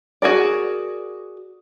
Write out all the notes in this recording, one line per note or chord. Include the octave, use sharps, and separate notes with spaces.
F#4 G#4 A#4 D5